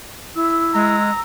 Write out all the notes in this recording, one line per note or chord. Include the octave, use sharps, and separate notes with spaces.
E4 E6
G#3 A#5